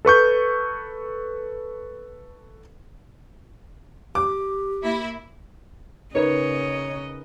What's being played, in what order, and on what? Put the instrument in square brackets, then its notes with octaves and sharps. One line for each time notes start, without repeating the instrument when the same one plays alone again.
[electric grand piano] A4 B4 C#6 G6
[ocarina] G4 [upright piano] D6
[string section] A#3 E4 E5
[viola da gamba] C#3 D#5 [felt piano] D#4 A#4 B4 [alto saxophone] C#5